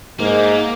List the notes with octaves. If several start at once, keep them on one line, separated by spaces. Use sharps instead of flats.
G#2 A#3